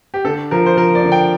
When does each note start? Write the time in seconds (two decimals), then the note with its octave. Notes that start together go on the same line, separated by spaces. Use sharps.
0.14 G4
0.25 D3 A4
0.51 F3 A#4
0.66 C5
0.77 F3 A#4
0.95 D5
1.04 D3
1.12 G5